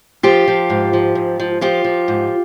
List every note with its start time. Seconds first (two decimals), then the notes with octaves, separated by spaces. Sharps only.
0.23 F3 F4 G4
0.48 F3
0.70 G#2
0.93 F3
1.15 G#2
1.40 F3
1.61 F3 F4 G4
1.84 F3
2.08 G#2